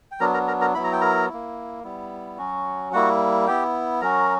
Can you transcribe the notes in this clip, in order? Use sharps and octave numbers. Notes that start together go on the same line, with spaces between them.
G5
F#3 B3 D4 A#4 A#5
A#4 A#5
A#4 A#5
A#4 A#5
F#3 B3 E4 B5
A#5
G5
A#4 A#5
A#3 E4
G3 B3 E4
F#3 C#4 F#4
G3 A#3 E4 F#4 F#5
B3 E4 G4 G5
F#3 C#4 F#4 A#4 A#5